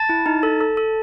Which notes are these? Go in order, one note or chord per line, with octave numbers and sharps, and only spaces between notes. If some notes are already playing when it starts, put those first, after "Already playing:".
Already playing: A5 A6
E4
D#4
A4
A4
A4